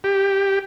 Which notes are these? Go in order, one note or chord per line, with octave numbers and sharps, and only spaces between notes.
G4